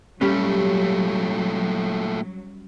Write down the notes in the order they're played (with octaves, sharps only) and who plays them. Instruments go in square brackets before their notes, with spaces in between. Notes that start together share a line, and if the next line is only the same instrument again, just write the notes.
[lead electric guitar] A#2 A3 [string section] F#3 [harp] G3 C#4